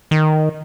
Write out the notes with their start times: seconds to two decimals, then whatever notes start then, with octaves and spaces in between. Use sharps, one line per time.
0.11 D#3